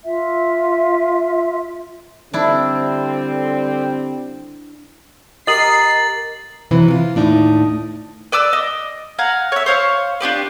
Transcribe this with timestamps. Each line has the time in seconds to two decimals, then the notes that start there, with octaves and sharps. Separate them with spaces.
0.05 F4 E5
2.33 D3 G3 C4 D4 E4
5.47 G4 A#4 D#5 D#6 A6 C7 F#7
6.71 C3 E3 F#3
6.88 E3 F4
7.15 D#2 A2 D4 D#4 D#5
8.32 B4 D5 D6 E6
8.53 D#5
9.19 F5 F#5 G#5 A#5
9.52 C#5 E5
9.66 C5 C#5 F5 C#6
10.20 D4 F4 G4 B4